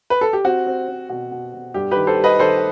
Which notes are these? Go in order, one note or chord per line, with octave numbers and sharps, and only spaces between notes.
B4
A4
G4
C4 F#4
C4
C4
B2 F#4
B2
B2
G2 G4
D#3 G4 B4
A4 C5
G3
B4 D#5
D#3 A4 C5